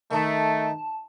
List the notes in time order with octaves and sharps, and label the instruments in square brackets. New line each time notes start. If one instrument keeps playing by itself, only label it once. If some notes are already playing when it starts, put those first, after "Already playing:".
[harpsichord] D#3 D#4 [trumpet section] A3 [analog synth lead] A5